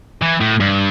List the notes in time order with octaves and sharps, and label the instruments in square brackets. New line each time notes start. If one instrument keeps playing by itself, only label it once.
[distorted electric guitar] E3
A2
G2